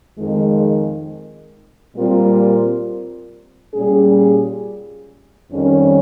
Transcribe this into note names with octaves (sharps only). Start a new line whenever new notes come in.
F2 D#3 G#3
A#2 G3 C4 F4 A#4
A#2 G3 C#4 G#4
F2 D#3 G3 C#4